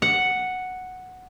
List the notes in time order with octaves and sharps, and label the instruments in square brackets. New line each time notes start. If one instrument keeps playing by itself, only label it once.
[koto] F#5